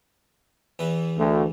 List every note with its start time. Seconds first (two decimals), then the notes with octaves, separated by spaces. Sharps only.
0.79 E2 E3 B4
1.16 D2